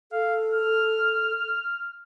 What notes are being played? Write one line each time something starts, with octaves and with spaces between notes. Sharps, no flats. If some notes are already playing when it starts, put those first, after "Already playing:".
A4 F5
F6